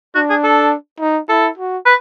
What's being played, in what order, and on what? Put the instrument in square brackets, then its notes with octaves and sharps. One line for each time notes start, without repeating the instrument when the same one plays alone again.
[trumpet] D4 [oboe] F#4
[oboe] G#4
A4
[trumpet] D#4
[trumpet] E4 [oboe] A4
[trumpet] F#4
[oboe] B4